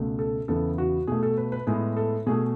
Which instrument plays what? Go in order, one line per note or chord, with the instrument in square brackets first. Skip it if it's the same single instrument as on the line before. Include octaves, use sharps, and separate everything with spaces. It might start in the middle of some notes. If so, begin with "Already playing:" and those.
Already playing: [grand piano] C#2 B2 A3
A4
E2 C#3 E3 B3 A4
F#4
B2 A3 G#4
A4
B4
B4
A2 G#3 B3 G#4
A4
B2 A3 G#4